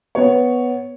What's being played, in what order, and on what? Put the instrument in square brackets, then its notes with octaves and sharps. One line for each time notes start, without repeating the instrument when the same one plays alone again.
[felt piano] B3 C#5